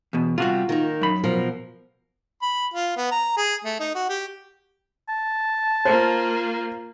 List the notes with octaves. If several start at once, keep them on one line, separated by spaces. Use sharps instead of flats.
E2 B2
C3 G3 F4 F#4
D#3 A#3 D#4
F#2 B5
B2 F3 A#4
B5
F4
B3
A#5
G#4
A3
D#4
F#4
G4
A5
A#3 F4 C5